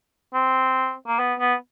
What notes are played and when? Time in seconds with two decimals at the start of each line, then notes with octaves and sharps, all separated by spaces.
0.34 C4
1.07 A#3
1.19 B3
1.39 B3